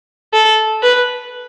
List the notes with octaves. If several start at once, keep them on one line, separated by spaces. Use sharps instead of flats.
A4
B4